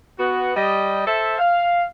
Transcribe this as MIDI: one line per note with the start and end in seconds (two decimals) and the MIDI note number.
0.19 0.52 59
0.19 0.52 66
0.56 1.02 55
0.56 1.02 75
1.07 1.35 69
1.07 1.35 72
1.07 1.35 76
1.38 1.83 77